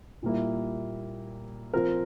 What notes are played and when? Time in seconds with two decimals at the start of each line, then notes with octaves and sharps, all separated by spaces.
0.23 A#2 G3 A#3 E4
1.74 F3 C4 F4 A#4